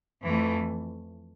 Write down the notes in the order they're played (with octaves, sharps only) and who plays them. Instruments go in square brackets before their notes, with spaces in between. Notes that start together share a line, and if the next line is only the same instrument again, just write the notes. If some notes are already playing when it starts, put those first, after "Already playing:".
[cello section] F2 E3 A3